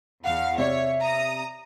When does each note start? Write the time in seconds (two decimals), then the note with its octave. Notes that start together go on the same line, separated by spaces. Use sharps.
0.24 E2 F5 F#5
0.58 C3 C#5 D5 E5
1.02 A#5 D#6